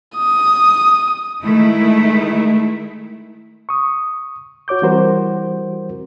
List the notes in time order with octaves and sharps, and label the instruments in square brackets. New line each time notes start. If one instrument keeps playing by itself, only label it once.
[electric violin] D#6
[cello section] D#3 G#3 A3 E4
[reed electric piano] C#6 D#6
F#4 C#5 D6 G6
E3 G3 C4 F#4 A#4 C5